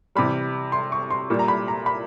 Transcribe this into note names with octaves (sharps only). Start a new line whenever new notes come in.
C3 E3 G3 B5
C6
C#6
C6
A#2 G3
A#5
B5
A#5
B5